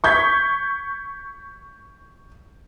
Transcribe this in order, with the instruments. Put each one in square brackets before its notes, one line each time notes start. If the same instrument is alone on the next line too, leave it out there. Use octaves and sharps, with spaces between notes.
[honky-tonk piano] C#6 G6 G#6 B6